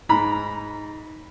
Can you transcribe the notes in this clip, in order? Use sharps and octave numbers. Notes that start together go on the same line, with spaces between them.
G#2 A#5 B5